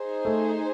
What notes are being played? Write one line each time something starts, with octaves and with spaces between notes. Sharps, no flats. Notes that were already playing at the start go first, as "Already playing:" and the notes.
Already playing: D#4 G#4 C5
A3